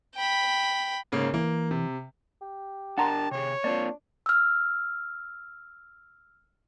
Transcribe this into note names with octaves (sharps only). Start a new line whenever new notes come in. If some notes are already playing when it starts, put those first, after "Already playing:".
G5 B5
G#2 C#3 A#3
E3 A#3
C3
G4
D4 A#4 F#5 A5 A#5 C6
C3 G#4 C#5
A#3 C4 D4 F4 D5
E6 F6